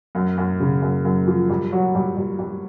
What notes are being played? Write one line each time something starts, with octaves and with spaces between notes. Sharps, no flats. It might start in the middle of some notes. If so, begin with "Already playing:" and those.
F#2
F#2
C#3
F#2
F#2
F3
G2
F#3
G2
G2
G2